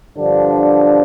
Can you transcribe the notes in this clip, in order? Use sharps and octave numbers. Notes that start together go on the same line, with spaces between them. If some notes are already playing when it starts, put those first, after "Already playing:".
G2 D3 F3 D4